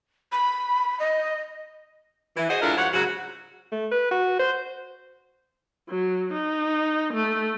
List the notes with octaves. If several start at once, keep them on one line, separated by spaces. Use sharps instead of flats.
B5
D#5
E3
F#4 G#4 C5 D#5
G#3 D4 E4 F4 A4 A#4
G2 F3 C#5 F#5
G#2 C#3 F#3 F#4
A3
B4
F#4
C5
F#3
D#4
A3